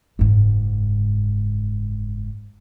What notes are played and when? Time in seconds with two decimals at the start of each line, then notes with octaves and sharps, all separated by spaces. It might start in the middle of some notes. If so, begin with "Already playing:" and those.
0.19 F#1 G#2